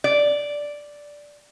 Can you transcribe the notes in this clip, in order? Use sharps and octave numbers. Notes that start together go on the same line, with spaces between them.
D5